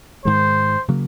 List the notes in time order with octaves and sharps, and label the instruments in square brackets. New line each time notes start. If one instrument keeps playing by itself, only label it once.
[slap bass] G#2 D#3 G#3 [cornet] C5
[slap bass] C#3 F#3 A#3